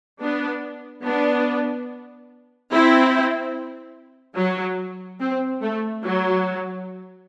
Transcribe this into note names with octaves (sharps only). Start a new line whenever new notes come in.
B3 D4
B3 D4
C4 E4
F#3
C4
A3
F#3